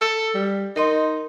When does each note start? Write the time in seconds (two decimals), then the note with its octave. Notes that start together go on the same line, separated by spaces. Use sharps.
0.01 A4
0.34 G3
0.76 D#4 A#4 D#5 C6